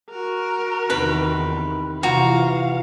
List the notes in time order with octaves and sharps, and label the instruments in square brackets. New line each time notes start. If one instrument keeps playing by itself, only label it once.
[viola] F#4 A#4
[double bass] E2 D#3 [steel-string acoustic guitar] C3 D#4 [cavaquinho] B4
[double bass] C3 E3 [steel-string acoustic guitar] F3 F4 A#5 [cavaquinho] F#4 [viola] F5